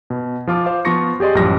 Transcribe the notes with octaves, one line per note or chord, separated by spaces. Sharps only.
B2
F3 F4 D6 F6
C5 F5 D6
F3 B3 F4 C#6 A#6 C#7
G4 G#4 D5 D#5 C6
A1 F#2 F3 G3 A#6